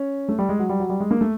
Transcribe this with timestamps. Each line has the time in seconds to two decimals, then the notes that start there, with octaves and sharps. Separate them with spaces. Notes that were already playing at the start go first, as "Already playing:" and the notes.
Already playing: C#4
0.29 A3
0.39 G3
0.49 G#3
0.59 F#3
0.69 G3
0.80 F#3
0.90 G3
1.00 G#3
1.11 A#3
1.21 A3